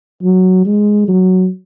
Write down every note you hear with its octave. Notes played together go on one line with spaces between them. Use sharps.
F#3
G#3
F#3